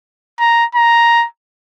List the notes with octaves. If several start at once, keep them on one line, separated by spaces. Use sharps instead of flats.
A#5
A#5